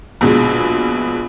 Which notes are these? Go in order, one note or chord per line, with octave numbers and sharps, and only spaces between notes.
A#1 B2 G#3